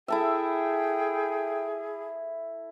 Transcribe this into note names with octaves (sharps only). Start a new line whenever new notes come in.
E4 G#4 A4 E5 G5